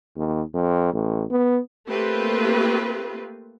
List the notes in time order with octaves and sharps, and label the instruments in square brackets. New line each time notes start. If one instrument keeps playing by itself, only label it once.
[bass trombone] D#2
F2
A1
B3
[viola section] A3 A#3 C4 F4 G4 B4